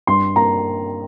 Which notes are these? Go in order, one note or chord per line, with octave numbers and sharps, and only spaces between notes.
G2 C6
A#3 A#5